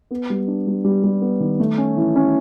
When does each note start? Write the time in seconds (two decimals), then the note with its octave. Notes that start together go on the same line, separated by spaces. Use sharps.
0.11 B3
0.30 G3
0.48 D4
0.67 G3
0.84 G3
1.04 G3
1.22 B3
1.40 D#3
1.60 A3
1.78 C#4
1.96 E3
2.16 C#4